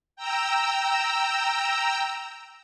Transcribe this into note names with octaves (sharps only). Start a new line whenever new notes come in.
G5 A#5 E6